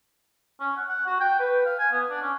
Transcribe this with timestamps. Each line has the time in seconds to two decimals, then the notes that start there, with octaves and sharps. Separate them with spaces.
0.60 C#4
0.77 F#5
0.89 F#5
1.07 F#4
1.20 G5
1.40 B4
1.66 F5
1.79 G#5
1.92 B3
2.10 D4
2.22 C#4